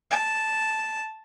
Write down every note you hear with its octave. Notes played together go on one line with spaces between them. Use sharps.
A5